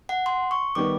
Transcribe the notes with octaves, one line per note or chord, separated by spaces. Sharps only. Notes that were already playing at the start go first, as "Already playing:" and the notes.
F#5
C6
C#6
D#3 G3 B3 D6